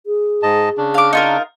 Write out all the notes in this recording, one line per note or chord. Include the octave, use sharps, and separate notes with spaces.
G#4
G#2 D#5 A5
C#3 D4
F5 D6
D#4 F4 A#4